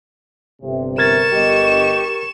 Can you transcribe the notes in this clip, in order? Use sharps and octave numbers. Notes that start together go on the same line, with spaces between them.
G1 C3
A#4 C#6 G#6 A6 E7
G1 G4 D#5